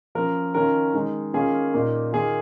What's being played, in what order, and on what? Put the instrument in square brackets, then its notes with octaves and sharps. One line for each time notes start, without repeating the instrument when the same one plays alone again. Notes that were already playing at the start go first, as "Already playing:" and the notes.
[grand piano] F3 A#3 C#4 A#4
D#3 C#4 F4 A#4
D#3 G#3 D#4
D#3 A#3 C#4 F4 G#4
A#2 A#3 D#4
D#3 A#3 F4 G#4